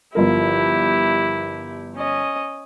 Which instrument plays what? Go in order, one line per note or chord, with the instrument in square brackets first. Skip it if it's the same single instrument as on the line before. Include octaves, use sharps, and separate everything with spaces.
[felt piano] G1 F3 A#4 [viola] E4 G4
[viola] C#4 D#5